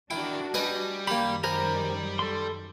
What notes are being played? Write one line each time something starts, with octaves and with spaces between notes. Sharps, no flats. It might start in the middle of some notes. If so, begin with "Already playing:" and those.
D4 E4 F#4 A#4 G5
G3 G#4 B4 D#5
F#2 D#3 A#3 G4 B5
G3 G#4 A#4 C5 A#5 B5
A4 C6